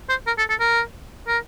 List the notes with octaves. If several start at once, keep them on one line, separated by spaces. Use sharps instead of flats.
C5
A#4
A4
A4
A#4
A#4